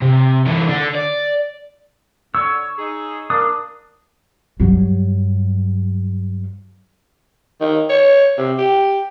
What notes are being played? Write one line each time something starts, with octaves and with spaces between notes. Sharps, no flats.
C3
D3 E3
D3 D4
D5
D3 C#5 E6
D#4 G#4
A#3 D4 D#6
G2 F#3
D#3
C#5
C3
G4